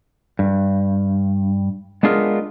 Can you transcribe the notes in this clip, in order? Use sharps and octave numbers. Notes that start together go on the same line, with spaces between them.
G2
G#3 B3 D4 F4 G#4 A#4